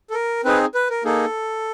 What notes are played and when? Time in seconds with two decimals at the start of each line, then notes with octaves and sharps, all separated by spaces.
0.10 A4
0.14 A#4
0.45 C4 D#4 G#4 B4
0.75 B4
0.90 A#4
1.04 A#3 D#4 G#4 A4